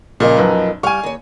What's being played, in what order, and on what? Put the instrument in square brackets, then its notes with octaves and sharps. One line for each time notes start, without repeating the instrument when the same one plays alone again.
[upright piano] A#2 C#3 [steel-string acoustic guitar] F3 A#4 D#5
[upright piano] B1 F#2 B4
[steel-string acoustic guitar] G3 F5 [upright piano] G#5 C#6
[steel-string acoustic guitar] D#2 C#5